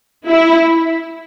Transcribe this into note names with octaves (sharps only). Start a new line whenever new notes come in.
E4